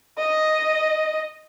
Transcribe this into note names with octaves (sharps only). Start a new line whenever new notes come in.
D#5